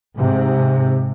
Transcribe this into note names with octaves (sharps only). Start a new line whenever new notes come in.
G#2 C3